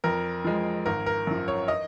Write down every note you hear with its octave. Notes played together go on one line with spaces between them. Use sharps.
F2 A#4
F3 G#3
G#1 A#4
A#4
F#2 F3
C#5
D#5